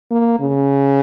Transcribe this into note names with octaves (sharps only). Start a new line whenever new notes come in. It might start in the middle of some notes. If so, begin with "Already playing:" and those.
A#3
C#3